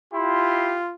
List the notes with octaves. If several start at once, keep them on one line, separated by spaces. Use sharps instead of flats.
E4 F4 G4 C6